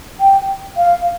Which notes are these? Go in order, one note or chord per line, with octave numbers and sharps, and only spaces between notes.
G5
F5